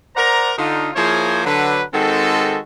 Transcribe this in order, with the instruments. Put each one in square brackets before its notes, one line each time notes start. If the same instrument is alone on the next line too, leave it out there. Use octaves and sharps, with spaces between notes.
[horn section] A#4 C5 D5 F#5 A#5
D3 D#4 F4
F3 A#3 E4 G#4 C5 C#5
D3 F#3 B4
D#3 G#3 C4 F#4 A4